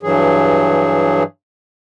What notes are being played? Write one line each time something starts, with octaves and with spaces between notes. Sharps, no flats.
G2 E3 F#3 G#4